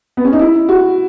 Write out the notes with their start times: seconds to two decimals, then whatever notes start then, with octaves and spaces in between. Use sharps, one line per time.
0.17 B3
0.25 C#4
0.33 D#4
0.39 E4
0.69 F#4